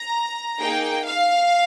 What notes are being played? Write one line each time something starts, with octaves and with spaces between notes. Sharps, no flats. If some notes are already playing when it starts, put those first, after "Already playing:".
Already playing: A#5
A#3 D#4 G#4 G5
F5